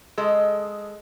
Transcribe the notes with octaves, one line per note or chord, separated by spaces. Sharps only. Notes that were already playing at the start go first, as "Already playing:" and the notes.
G#3 A4 D#5